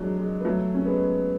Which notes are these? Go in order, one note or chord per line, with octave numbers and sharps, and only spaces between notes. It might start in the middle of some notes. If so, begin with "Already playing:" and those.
Already playing: F#3 G#3 D4
G#3
B3
F#3 A3
C#4
G#3 B3